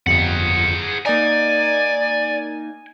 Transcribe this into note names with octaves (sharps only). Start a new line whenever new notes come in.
G1 F2 G#4 F#5
A#3 D#4 D5 G#5